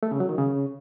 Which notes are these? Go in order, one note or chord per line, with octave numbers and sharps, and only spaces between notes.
A3
C#3
F#3
D#3
C#3